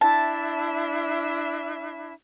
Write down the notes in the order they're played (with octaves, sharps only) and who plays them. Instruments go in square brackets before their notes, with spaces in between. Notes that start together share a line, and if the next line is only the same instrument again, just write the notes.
[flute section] D4 E4 E5 [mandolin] A5